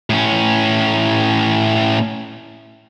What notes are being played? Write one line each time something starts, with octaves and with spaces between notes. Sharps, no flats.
A2 C#4